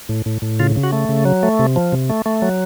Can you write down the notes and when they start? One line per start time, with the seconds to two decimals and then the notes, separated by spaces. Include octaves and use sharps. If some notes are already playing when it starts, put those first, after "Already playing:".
0.09 A2
0.26 A2
0.42 A2
0.59 C#3 F4
0.76 C#3
0.83 F#4
0.92 A3
1.09 C#3
1.25 F#3
1.43 A3
1.59 C3
1.76 F3
1.93 C3
2.10 A3
2.26 A3
2.42 F#3